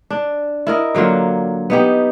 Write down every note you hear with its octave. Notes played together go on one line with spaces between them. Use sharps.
D4
E4 A#4 D#5
D3 F#3 A#3 F4
B3 D#4 G4